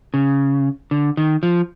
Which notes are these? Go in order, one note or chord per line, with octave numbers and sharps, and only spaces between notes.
C#3
D3
D#3
F3